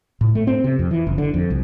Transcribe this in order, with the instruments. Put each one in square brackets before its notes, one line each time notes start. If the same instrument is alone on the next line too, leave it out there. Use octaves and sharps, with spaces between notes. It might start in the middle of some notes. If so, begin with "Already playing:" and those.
[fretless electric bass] A2
A3
C4
C3
F2
E3
F#1
D3
F2
C2